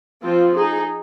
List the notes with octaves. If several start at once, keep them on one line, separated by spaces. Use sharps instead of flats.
F3 C4 F4
D#4 G#4